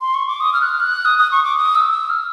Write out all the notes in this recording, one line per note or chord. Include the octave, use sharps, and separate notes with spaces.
C6
C#6
D6
D#6
F6
F#6
F6
F#6
D#6
D#6
C#6
D6
D#6
E6
E6
F6